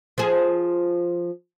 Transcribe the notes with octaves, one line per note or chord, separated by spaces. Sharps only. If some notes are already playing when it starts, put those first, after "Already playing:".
F3 G#4